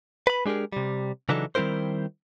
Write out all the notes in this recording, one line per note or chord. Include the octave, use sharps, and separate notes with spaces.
B4 B5
G#3 D4 G4 G#4 A#4
C3 G3
C#3 E3 F#3 D4 D#4 A4
D#3 G3 C4 E4 A#4 C5